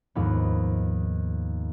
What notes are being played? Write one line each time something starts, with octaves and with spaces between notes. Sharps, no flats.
D#2 G#2 F3 B3